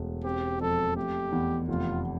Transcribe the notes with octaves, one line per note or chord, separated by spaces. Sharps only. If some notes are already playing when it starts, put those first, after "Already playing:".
Already playing: E1 A3
C4 G4
F2 A4
A3 G4
E2
F1 F4